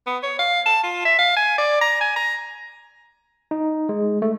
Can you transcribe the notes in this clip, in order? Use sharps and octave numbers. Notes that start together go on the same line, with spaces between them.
B3
C#5
F5
A5
F4
E5
F5
G#5
D5
A#5
G#5
A#5
D#4
G#3
A3